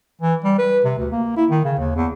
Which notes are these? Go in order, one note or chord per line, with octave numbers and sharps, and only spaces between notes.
E3
G3
B4
C3
D2
A#3
E4
D#3
C#3
D#2
E2